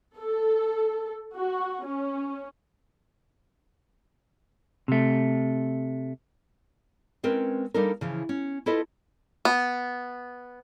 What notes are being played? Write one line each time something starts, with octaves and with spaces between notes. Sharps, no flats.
A4
F#4
C#4
C3 A3
G#3 C4 C#4 A#4 B4
G3 A#3 D4 D#4 A4 A#4
C#3 E3 F3
C#4
E4 F4 A4 B4 D#5 A5
B3